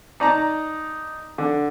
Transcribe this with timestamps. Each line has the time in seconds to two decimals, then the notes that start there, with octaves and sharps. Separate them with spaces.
0.20 D#4 D5 A5 A#5
1.38 D3